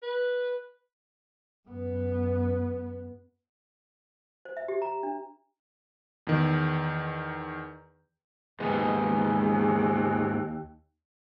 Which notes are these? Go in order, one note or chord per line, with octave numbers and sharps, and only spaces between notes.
B4
F#2 B3
C5
E5
G4
A#5
D4
E2 D#3
D#2 G#2 G#3 B3 G#4